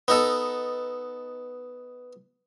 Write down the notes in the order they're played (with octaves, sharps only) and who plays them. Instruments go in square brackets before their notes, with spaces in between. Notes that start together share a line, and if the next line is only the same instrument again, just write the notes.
[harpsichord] B3 D#4 A4